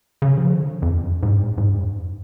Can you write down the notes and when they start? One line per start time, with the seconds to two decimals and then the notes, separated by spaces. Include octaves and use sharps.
0.22 C#3
0.37 F3
0.53 D3
0.82 F2
1.03 F#2
1.23 G#2
1.43 A2
1.58 G#2
1.73 F2
1.88 F#2